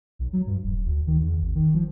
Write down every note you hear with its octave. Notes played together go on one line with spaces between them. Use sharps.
B1
F#3
G2
D#1
D2
D#3
E2
G#1
D#3
F3